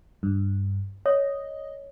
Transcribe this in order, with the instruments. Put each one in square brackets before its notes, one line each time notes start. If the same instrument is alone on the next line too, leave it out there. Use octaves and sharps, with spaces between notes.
[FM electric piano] G2
[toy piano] C#5 [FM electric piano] D#5